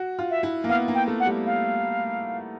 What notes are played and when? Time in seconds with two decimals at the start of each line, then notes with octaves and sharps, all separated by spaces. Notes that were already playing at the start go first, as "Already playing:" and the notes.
Already playing: F#4
0.19 F4
0.31 E5
0.43 E4
0.64 A#3
0.69 B3 F5
0.88 A#3
0.95 G5
1.07 A3
1.20 F#5
1.26 G3
1.46 F5